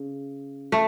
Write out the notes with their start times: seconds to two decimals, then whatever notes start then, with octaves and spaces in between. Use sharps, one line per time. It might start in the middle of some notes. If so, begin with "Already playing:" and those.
Already playing: C#3
0.72 A3